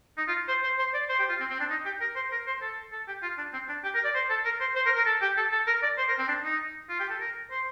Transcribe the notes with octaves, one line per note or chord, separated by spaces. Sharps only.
D#4
F4
C5
C5
C5
D5
C5
G4
F4
C4
C4
D4
D#4
G4
A#4
C5
A#4
C5
A4
A4
G4
F4
D4
C4
D4
G4
A#4
D5
C5
A4
A#4
C5
C5
A#4
A#4
A4
G4
A4
A4
A#4
D5
C5
A#4
C4
D4
D#4
F4
G4
A4
A#4
C5